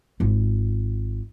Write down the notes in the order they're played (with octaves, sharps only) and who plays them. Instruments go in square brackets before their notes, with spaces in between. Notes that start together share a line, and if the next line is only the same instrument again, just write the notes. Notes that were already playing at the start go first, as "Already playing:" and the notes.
[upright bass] G#1 F4